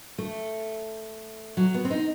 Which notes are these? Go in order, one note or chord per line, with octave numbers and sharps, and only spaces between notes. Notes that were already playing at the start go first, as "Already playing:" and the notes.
A3
F#3
B3
C4
D#4